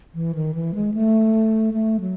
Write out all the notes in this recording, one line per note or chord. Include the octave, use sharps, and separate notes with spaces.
E3
D#3
E3
G#3
A3
A3
F#3